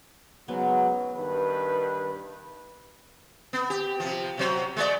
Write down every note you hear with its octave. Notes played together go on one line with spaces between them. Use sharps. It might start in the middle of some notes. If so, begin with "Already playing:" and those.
G#2 C#3 F#3 B3
G2 D#3 B4
B3
G4
C3 F3
C3 F#3 C5
G#3 A3 D5